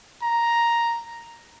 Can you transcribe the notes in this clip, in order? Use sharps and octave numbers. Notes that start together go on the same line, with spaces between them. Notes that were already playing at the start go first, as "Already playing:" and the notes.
A#5